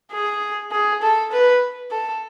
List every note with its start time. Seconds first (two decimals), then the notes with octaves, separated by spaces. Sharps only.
0.12 G#4
0.72 G#4
1.02 A4
1.32 B4
1.91 A4